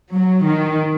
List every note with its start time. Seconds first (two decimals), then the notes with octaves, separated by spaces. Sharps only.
0.12 F#3
0.47 D#3